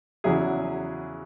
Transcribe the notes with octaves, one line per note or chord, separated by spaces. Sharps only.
E2 C#3 F#3 E4 G#4